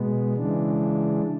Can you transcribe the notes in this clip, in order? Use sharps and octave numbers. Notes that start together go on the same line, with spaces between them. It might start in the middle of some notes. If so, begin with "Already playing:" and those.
Already playing: B2 G#3 B3
C#3 E3 G#3 D4